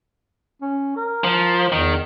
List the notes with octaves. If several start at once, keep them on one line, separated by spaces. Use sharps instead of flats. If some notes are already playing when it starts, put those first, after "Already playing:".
C#4
A#4
F3
E2 D#3